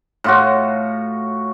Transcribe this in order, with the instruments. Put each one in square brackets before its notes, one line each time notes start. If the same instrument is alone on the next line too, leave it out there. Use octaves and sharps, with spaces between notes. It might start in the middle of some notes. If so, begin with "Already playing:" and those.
[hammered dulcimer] A2 F4 F#4